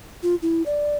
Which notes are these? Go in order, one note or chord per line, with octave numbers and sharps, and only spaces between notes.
F4
E4
D5